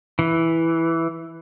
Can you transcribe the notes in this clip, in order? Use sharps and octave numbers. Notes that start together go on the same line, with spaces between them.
E3